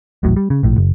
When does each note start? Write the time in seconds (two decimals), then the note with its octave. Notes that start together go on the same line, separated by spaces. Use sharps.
0.23 D#1 A1 A2 F#3
0.36 G3
0.50 C#3
0.63 A#1 A2
0.76 F#1